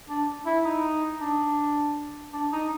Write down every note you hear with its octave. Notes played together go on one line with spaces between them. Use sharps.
D4
E4
D#4
D4
D4
D#4